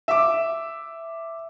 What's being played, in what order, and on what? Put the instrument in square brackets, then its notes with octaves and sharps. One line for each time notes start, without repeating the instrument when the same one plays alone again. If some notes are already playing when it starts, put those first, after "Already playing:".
[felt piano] E5 D6